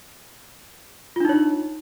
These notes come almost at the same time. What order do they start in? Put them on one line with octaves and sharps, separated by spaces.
F4 D4 D#4 C#5